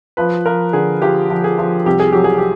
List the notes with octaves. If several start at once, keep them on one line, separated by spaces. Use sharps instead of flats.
F3 B4
F3 A#4
D3 G#4
F3 G4
F3
G#4
F3
C2 G4
G#4
F#3 G4
G#4
G4